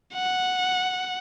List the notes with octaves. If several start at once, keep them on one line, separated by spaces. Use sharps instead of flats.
F#5